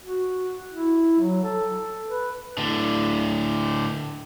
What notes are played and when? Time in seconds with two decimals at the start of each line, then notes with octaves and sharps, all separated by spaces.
0.04 F#4
0.72 E4
1.20 F#3
1.44 A4
2.09 B4
2.58 A2 D3